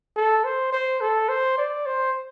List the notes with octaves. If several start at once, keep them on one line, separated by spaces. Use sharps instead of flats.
A4
C5
C5
A4
C5
D5
C5